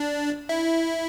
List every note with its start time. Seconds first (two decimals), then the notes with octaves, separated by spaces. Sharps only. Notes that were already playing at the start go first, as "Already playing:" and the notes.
Already playing: D4
0.49 E4